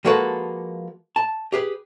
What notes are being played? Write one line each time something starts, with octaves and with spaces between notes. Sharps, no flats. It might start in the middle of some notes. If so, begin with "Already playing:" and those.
F3 G#3 A#3 F#4 A4 B4
A5
G4 G#4 B4